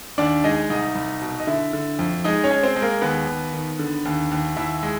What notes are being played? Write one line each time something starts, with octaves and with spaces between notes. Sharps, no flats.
D#2 D4 D5
G#3 D#4 D#5
C2 D#4 D#5
C2
B2
D#5
D3 E4 E5
D3
F2
G#3 D#4 D#5
C#4 C#5
G#3
C4 C5
G#3
A#3 A#4
D#2 B3 B4
D#2
D#3
D3
D#2
D#2
D#2 E4 E5
G#3